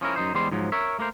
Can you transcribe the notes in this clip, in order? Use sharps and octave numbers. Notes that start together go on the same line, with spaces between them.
F3 C#4 E4 A#4
F#2 D#4 C5
E2 G3 G#3 C5 C6
G#2 F3 F#3
A#4 C#5 E5
A3 A#3 A#4 C5